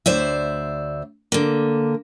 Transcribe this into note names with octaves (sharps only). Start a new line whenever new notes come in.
D2 C5 D5 E5
D3 A#3